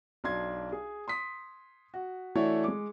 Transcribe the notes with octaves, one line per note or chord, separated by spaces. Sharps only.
B1 D4 C6 G#6
G#4
C6 D#6 B6
F#4
E3 A3 D4 E4 F#4 C#5
G#3 D6